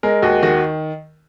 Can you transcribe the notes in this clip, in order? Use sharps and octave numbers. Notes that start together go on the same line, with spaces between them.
G#3 A#4
D#2 F#4
D#3 F#4